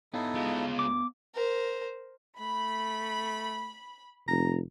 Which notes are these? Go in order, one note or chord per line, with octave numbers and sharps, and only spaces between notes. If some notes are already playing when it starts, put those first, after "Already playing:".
B3 D#4 E4 A4 C#5 F5
G#3 F4
D2 D6
A#4 C5
A3 B5
F1 A#5